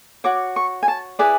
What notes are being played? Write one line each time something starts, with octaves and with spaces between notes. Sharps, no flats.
F#4 C#5 D6
C#6
G#5
A5
E4 G#4 B4 D5 G#5